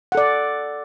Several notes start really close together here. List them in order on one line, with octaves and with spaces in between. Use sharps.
F#5 A4 D5